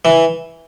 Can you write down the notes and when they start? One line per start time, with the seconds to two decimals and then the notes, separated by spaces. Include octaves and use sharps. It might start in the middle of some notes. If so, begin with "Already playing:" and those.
0.05 E3